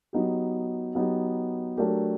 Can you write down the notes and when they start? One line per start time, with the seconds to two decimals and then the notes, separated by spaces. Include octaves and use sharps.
0.13 F#3 B3 D#4 G4
0.95 F#3 B3 D#4 G4
1.77 F#3 A3 D4 G4 A#4